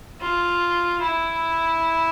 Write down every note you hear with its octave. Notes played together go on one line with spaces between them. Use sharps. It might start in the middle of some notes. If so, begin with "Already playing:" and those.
F4
E4